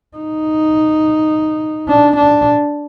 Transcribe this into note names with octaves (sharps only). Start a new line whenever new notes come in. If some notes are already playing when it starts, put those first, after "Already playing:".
D#4
D4
D4